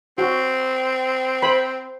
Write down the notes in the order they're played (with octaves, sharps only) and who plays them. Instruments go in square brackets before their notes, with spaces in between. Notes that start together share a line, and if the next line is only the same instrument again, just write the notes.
[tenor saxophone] C4 [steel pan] F#4
[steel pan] C5 B5